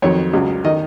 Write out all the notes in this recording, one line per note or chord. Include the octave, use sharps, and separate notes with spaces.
F2 D#3 F#3 C#5
C#2 C#3 F#3
D#3 D#5